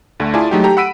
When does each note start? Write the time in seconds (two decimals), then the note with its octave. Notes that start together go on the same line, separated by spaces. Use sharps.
0.20 D2 D3 A3
0.34 E4 F4 G#4 D5 G#5 A5
0.51 F#3 G#3 A3 D#4 F#4 G4
0.64 G4 A4 A#5
0.77 F#5 B5 E6 B6 D7 D#7